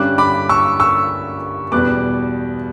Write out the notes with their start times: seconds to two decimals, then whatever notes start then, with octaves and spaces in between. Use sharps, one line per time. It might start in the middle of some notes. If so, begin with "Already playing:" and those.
Already playing: G2 D3 G3 C#4 D6 F#6
0.18 B5 D6
0.49 C#6 E6
0.80 C#6 E6
1.72 E2 B2 G3 B3 D6 F#6